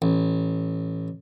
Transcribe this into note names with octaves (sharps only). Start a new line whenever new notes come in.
A1